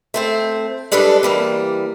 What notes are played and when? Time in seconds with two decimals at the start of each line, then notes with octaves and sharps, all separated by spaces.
0.14 A3 C4 C5
0.92 G3 G#3 D4 A4 B4 D5
1.23 E3 G3 A#3